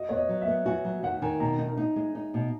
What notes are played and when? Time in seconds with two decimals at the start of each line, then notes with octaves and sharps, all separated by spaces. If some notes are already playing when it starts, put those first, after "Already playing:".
Already playing: F#4 D#5
0.09 B3 C#5
0.17 D#5
0.29 F#3
0.41 E5
0.48 B3
0.66 F#4 G#5
0.84 F#3
1.03 D#3 F#5
1.22 D#3 G#5
1.40 B2 A#5
1.59 D#4
1.77 D#4
1.96 G#3
2.15 D#4
2.34 B2